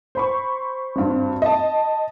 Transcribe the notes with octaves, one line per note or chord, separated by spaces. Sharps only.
C5 B5 C#6
G#1 G2 C4
D#5 A5